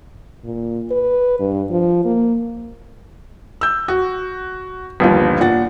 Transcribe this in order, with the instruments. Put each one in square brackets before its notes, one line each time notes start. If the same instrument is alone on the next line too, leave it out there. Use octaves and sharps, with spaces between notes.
[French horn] A#2
B4
G2
F3
A#3
[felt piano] E6 G6
F#4
G1 D#2 F3
A#2 F#5 A6